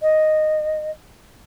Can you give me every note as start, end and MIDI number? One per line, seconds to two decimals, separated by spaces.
0.02 0.91 75